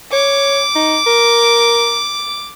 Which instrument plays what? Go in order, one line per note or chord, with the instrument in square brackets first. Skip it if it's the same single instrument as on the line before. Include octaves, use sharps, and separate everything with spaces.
[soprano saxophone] C#5 [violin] D6
[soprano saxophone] D#4
A#4